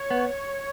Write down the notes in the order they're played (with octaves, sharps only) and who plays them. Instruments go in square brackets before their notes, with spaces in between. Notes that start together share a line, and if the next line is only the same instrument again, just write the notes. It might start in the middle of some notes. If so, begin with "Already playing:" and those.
Already playing: [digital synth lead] C#5
[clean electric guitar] B3